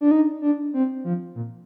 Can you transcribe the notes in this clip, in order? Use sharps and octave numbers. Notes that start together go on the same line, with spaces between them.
D4
D#4
D4
C4
F3
A#2